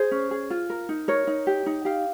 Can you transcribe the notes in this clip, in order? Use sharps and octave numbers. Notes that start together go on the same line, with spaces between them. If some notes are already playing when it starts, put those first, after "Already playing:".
Already playing: G#4 C5
C#4
G#4
F4
A#4
D#4
A#4 C#5
D#4
G4
D#4
G4 F5